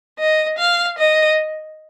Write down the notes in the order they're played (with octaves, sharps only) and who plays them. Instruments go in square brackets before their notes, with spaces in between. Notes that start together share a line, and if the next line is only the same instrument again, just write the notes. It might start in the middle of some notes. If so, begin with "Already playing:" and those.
[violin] D#5
F5
D#5